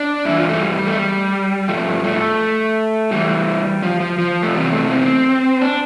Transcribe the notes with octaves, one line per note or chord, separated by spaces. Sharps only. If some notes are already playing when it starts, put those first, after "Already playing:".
Already playing: D4
G2 E3 E4
F4
A3
G3
A3
G3
G2 F3 A3
A3
A2 E3 G3
F3
F3
F3
A3
E2 C3 E3 G3
A3
C4
D4